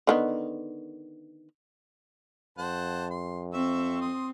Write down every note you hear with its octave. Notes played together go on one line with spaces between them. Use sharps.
D3 D#3 B3
F2 C5 F#5 A5
C6
C4 E5 C#6 E6
C6 D#6